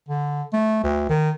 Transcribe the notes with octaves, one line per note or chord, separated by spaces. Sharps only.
D3
A3
D2
D#3